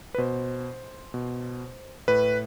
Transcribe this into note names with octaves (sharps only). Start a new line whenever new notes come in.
B4
B2 C5
B2
A2 B4